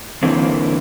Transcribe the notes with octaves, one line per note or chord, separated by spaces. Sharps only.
D3 E3 A#3 C4